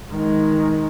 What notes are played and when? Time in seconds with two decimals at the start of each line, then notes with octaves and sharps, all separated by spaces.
0.11 D#3 G#3